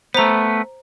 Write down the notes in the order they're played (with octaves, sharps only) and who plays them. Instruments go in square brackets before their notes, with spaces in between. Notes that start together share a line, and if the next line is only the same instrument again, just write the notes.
[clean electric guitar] A3 B3 [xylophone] C5 A#5